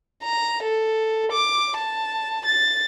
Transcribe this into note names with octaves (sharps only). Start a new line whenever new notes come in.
A#5
A4
D6
A5
A6